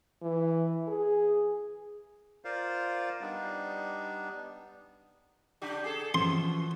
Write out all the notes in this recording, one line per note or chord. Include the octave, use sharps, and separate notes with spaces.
E3
G#4
F4 A#4 C5 D5 F5
G3 B3 D4 D#4
C#3 D4 G4
G#4 A4
B2 E3 F3 C#4 C6